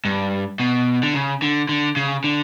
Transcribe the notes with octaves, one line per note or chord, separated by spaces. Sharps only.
G2
B2
D3
C#3
D3
D3
C#3
D3